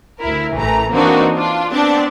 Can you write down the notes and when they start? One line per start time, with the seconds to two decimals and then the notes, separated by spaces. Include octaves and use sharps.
0.20 D2 E4 A#4
0.55 A1 E3 A3 A#5
0.93 E3 A#3 C4 D4 D#4 F#4
1.34 D4 F4
1.72 B3 C4 D4 D5 A5